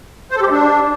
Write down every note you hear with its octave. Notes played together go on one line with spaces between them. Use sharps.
C5
A4
G4
G#3
D4